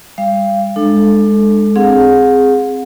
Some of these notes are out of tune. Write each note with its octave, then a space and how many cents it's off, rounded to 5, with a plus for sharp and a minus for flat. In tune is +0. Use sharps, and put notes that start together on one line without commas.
G3 +30 F5 -25
G#3 +0 D4 +25 A4 +0
C4 +0 G#4 +0 F#5 -40